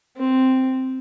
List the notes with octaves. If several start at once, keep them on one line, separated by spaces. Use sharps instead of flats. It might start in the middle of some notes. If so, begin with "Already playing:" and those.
C4